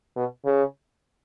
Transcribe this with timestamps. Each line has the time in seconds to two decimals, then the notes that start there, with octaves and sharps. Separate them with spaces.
0.16 B2
0.45 C#3